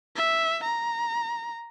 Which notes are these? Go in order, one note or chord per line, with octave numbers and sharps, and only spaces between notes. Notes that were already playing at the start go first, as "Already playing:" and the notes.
E5
A#5